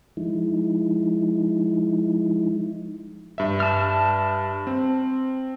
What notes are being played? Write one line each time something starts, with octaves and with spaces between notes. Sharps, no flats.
F3 G#3 D#4 E4
G2 E5
A5 F6
C4